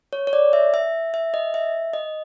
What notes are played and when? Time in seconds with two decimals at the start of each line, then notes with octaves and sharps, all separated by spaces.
0.13 C#5
0.27 C#5
0.33 D5
0.53 E5
0.74 E5
1.14 E5
1.34 D#5
1.54 E5
1.93 D#5